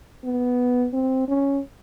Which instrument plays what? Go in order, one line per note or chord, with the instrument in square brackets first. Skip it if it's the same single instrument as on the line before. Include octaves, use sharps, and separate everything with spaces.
[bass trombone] B3
C4
C#4